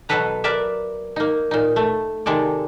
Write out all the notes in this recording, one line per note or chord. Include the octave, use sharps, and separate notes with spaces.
B2 F#3 A4 B4 A#5
A#4 B4 D5 E5
A#3 D#4
A#2 D#4
A3
C3 D#3 G#3 A4 D5